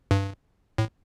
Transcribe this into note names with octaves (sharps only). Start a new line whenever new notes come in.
G2
A2